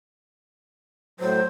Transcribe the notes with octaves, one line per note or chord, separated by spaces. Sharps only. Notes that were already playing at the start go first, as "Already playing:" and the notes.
A2 F#3 C5